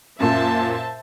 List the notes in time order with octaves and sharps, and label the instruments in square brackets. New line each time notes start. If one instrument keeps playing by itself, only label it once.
[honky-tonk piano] F#2 A#2 [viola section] C5 E5 A5